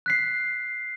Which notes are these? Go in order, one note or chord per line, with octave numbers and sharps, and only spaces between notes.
F#6 B6 C7